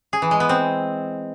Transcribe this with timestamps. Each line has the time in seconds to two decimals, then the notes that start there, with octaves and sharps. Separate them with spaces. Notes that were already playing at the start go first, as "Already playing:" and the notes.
0.13 G#4
0.22 E3
0.31 G#3
0.40 B3
0.49 C4